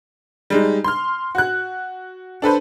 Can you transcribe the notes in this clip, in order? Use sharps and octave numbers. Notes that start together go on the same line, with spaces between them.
G3 G#3 D#4
C6 F6
F#4 F#6
D4 A4 B4 C5